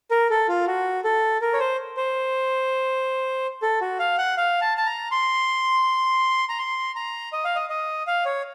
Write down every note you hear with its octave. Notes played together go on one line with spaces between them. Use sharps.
A#4
A4
F4
F#4
A4
A#4
C#5
C5
C5
A4
F#4
F5
F#5
F5
A5
A5
A#5
C6
A#5
C6
A#5
D#5
F5
D#5
D#5
F5
C#5